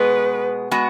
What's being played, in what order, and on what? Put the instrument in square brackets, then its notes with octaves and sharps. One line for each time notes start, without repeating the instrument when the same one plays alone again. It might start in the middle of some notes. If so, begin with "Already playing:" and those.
Already playing: [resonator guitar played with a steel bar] B2 G#3 B3 [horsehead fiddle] B4
[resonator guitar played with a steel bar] G#3 B3 F#4